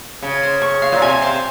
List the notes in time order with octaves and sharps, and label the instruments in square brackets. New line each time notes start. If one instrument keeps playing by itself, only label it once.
[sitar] C#3 [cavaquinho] G#5
[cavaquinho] C5
C#6
F5
[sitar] A#2
[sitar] C3 [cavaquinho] G#5
[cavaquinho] C5